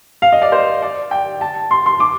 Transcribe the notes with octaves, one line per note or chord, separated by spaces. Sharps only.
F5
D#5
D5
C5
D5
G5
A5
C6
C6
D6